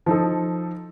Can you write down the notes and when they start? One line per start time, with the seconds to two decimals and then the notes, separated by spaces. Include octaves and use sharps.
0.06 F3 D#4 A4